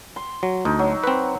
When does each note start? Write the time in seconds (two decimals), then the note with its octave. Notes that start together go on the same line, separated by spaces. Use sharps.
0.16 C6
0.43 F#3
0.65 D2 D#4
0.79 F#3
1.04 C4 B4